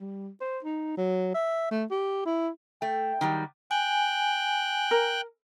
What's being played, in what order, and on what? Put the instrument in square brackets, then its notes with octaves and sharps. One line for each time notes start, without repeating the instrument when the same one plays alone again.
[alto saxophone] G3
C5
D#4
F#3
E5
A3
G4
E4
[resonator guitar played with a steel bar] A3 [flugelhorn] G5
[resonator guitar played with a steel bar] D#3 F#3 G3
[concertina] G5 F#6 [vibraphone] G#5
[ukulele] A#4